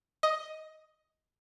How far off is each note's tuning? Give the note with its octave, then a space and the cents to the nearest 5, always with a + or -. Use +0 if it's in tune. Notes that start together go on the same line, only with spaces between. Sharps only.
D#5 +10